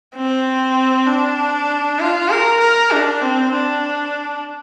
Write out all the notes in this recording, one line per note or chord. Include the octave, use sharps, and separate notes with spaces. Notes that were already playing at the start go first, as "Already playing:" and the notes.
C4
D4
F4
A#4
A#4
D4
C4
D4